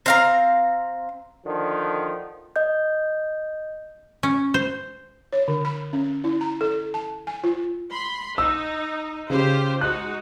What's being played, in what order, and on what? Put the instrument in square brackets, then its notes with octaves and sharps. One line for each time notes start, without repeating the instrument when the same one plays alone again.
[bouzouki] C4 F5 A#5
[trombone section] D3 D#3 F3
[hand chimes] D#5 G6
[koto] C#4
C5
[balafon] C#5
D3
B5
C#4
E4
A#5
A4
A5
G#5
F4
[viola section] B5 C6
[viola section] D#4 [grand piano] E6
[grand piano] C#3 [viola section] F4 G4 C5
[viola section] G#3 D#4 F#4 [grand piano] F#6